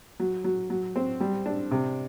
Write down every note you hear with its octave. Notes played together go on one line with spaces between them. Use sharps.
F#3
F#3
F#3
C4
G3
D4
C3